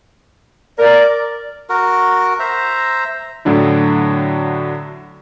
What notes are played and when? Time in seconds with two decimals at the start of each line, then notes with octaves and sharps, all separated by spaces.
0.79 A#4 D5
1.70 F#4 A#4
2.40 C5 E5 A#5
3.45 A2 D3 F#3 D4 E4